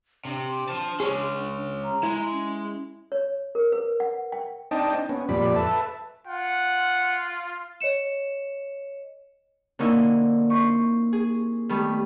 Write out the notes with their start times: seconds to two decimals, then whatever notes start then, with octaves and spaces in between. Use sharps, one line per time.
0.25 C3 D4
0.69 C5 A5
1.00 G#3 C#4 G#4
1.85 A#5
2.03 G#3 E4
2.33 C#4
3.12 C#5
3.55 A#4
3.72 B4
4.00 F#5
4.32 G5
4.71 C4 D4 D#4 D#5 G5 A5
5.09 B3 C#4
5.29 F2 A#2 F3 G3 D5 B5
5.56 A4 B4 E5 A5
6.27 F4 F#5
7.81 C#5 D#5 C#7 E7
9.79 D3 A#3 C4 C#4 D#4 E4
10.50 C6 C#6
11.13 G#4
11.69 D#3 G3 A3 B3